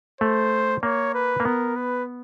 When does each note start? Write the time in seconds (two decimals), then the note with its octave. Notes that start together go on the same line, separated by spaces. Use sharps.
0.21 A3 C5
0.83 A#3 C#5
1.14 B4
1.40 A#3
1.45 B3 A#4
1.76 B4